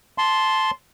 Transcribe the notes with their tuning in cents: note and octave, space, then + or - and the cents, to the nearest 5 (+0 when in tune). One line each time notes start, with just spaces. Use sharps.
A5 -10 C6 +0